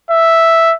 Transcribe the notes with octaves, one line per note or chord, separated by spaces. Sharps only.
E5